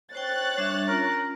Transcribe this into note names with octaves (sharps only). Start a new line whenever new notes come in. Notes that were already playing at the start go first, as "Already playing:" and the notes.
C5 C#5 G5 F#6 A6
G3 D4 E5
C#4 F4 A#4